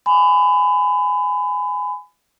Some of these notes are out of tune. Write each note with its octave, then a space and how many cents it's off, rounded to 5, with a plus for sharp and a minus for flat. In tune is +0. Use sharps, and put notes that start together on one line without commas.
G#5 +0 B5 +30